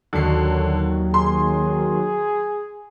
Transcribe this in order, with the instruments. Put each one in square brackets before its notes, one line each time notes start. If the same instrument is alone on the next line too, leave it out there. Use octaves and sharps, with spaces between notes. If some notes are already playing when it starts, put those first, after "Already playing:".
[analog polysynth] D#2 D#3 F#3 [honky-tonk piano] D3 C7
[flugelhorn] G#4 [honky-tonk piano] C6